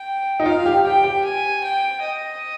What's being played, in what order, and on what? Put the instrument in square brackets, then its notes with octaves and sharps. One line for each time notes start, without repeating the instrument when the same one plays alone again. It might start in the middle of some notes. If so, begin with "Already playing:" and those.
Already playing: [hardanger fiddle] G5
[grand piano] D#4
[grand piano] F4 [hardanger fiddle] F5
[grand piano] G4
[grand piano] G4 [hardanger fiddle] G5
[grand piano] G4
[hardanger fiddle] G#5
G5
D#5